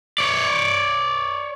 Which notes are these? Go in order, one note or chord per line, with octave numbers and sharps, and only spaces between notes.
C#5 D5